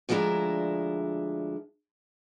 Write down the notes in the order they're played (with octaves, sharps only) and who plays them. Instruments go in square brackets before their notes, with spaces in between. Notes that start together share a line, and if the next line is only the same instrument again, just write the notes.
[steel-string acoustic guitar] D2 F3 G#3 D4 E4 A#5